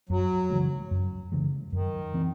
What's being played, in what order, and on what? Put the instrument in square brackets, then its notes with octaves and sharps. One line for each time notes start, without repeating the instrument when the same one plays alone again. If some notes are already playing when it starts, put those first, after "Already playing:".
[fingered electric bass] F#2 [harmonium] F#3
[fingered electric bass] C#3 E3 G#3
F#2
C#3 E3 G#3
[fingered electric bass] F#2 [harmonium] D#3
[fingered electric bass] E3 C4